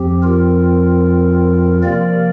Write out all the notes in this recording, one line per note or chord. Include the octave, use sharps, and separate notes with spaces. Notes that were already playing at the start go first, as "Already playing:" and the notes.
Already playing: F2 F3 C4 G4
F4 A#4
C3 F3 A#3 A#4 D5